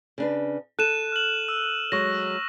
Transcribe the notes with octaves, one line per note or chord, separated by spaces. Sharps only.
C#3 D4 B4
A4 F#6 D#7 E7
F6 F#7
E6
F#3 G#3 C#6 A#6